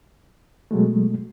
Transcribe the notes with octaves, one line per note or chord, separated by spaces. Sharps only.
B2 F#3 G#3 A3